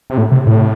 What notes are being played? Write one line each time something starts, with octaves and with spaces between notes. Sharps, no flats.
C3
A2
C3
A2